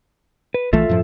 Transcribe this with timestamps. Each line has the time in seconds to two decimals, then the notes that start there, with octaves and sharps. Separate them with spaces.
0.54 B4
0.73 A#1 E3 A3 F4 A4 E5
0.89 F#2 A2 F3